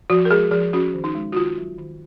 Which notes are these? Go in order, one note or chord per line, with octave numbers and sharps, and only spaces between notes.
F3 F#4
A#4
G#3 G#4
F3 G#4
C#4 F#4
D#3
D#4
G#3
F#4
D#3 F4
F#3
D#3